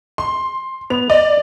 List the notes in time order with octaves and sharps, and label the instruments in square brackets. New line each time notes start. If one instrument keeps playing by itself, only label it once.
[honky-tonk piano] C6
[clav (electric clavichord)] B3 [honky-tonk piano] F7
[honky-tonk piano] D5 [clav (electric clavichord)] D#5